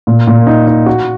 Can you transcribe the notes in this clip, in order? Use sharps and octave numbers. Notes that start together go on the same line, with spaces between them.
A#2
A#2
D#4
D#4
F#4